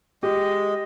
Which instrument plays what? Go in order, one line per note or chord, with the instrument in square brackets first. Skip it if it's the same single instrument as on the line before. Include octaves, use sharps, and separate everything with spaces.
[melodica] G#3 D#5 [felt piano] G4